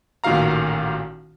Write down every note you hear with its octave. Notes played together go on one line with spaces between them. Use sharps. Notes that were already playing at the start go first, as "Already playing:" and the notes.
A1 A#2 D#3 F#4 F5 A#5